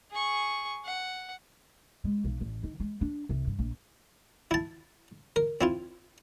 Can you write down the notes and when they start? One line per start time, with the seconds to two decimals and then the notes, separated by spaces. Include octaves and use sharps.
0.11 G#4 C#6
0.85 F#5
2.04 G#3
2.24 B1
2.40 A1
2.63 D#3
2.80 G#3
3.01 D4
3.29 C2
3.47 G2
3.59 A#1
4.51 E4 A5
5.36 A#4
5.61 C4 E4 F4